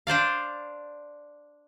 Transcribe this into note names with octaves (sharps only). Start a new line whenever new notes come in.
D4 C5 D5 F5